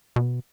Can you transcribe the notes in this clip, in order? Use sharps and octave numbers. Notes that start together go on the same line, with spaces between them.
B2